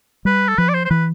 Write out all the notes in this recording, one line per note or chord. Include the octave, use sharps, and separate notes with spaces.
G3 B4
A4
F3 B4
D5
C5
C5
E3 B4